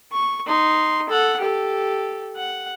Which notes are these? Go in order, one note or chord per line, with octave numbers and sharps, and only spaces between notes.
C#6
D#4 C6
A4 F#5
G4 A4
F#5